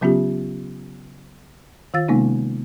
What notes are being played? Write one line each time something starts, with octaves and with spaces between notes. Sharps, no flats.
C#3 F#3 B3 C#4 F4 G4
D#3 F4 F5 E6 A6
C3 G#3 A#3 B3 C#4 D#4